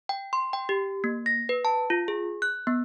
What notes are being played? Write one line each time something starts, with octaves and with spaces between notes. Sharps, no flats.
G5
C6
G5
G4
A#3
A#6
B4
A5
F4
G#4
F#6
B3